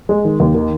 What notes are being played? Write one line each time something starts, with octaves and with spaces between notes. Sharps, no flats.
G#3
D#3
D#2
D#3